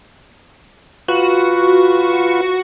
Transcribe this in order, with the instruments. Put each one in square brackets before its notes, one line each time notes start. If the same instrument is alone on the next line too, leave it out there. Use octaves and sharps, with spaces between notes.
[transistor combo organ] F4 B4 [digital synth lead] F#4